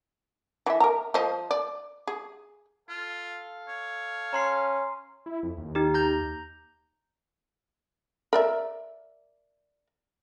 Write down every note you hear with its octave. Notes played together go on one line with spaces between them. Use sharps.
E3 E5
A#4 A#5
F3 C5 D#5
D5
G#4
F4 A4 F5
C#5
C#4 A#5 C6 C7
E4
F2
D#2
D#4 G4
A#5 G6
A#4 D5 E5